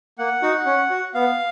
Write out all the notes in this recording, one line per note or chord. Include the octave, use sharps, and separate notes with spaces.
A#3 F#5
D#4 F#4
C#4
F#4
B3 F5